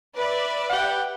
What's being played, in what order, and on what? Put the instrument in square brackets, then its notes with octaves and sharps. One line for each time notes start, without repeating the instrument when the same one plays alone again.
[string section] B4 D5 E5
[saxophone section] G4 F#5